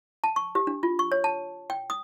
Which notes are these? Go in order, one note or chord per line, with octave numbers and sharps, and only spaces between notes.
A5
C#6
G4
D4
F4
C#6
C#5
A5
G5
D#6